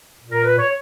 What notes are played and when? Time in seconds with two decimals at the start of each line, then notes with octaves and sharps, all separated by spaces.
0.19 A#2
0.31 A#4
0.44 B4
0.58 C#5